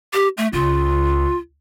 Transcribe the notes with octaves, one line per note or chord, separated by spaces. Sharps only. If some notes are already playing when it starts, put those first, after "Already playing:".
G4
A3
C#2 F4